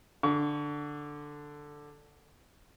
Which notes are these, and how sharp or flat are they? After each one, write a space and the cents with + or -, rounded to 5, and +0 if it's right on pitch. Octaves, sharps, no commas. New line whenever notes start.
D3 +0 C#6 +35